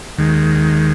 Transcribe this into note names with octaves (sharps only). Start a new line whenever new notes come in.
D#2 D#3 G#3